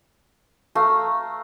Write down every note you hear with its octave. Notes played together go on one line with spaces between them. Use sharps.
A3 F5 A#5